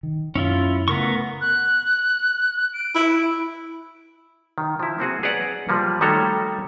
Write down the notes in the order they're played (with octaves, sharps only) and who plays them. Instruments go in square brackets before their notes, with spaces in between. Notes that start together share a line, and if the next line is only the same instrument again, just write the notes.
[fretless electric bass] D#3
[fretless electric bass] F#2 [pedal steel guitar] C#4 E4 F4
[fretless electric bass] C#3 A3 [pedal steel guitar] B3 A#4 C#6
[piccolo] F#6
D7
[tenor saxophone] E4
[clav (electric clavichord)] D#3
F3 E4
A#3 C4 F#4 G#4
G#4 B4 C#5 D5 F#5 A#5
F3 G3 A#3
D#3 G3 A3 F#4 A4 C#5